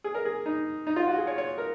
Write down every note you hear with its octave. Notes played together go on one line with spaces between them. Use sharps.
G#4
A#4
G#4
D#4
D#4
F4
F#4
G#4
C#5
C#5
A#4